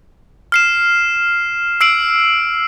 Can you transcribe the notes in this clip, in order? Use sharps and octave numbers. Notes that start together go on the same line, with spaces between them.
F6 C7 E7
E6 C7 D7 F#7